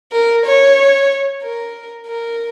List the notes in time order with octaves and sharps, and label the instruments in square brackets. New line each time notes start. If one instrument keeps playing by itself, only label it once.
[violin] A#4
C#5
A#4
A#4